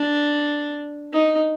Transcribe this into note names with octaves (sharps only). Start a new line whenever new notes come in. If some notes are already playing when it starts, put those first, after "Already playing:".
Already playing: D4
D#4